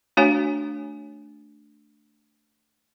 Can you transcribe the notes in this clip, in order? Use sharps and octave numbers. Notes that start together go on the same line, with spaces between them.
A3 D4 F#4 C#5 F5 G#5